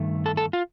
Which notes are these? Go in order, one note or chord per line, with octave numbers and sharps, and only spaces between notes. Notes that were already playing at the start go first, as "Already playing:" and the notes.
Already playing: G2 D#3 A3
A4
A4
F4